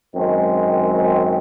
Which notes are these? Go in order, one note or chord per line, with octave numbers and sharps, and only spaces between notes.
F#2 D#3 G#3 C4